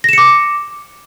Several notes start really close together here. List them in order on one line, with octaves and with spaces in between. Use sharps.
A#6 E7 C#7 D6